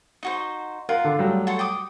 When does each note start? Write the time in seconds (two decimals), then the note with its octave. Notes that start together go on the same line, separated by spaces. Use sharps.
0.23 D#4 F#4 C5
0.89 F4 A#4 F#5
1.04 D3
1.19 F#3 G3 A3
1.47 F#4 A4 C6
1.59 G5 D6 D#6